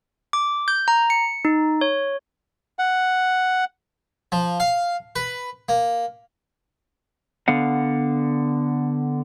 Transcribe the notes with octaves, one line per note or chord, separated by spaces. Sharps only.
D6
G6
A#5
C#7
D#4
C#5
F#5
F3
F5
B4
A#3
D3 B3 F5 F#5